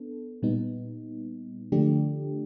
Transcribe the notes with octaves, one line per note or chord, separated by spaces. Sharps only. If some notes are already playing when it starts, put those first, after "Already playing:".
Already playing: B3 D4 A4
A#2 G3 B3 D#4
D3 F3 A3 D4 G4